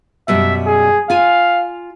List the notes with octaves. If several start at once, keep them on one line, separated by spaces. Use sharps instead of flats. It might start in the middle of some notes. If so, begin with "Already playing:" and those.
F#2 B2 G3 E5
G#4
F4 F5 G#5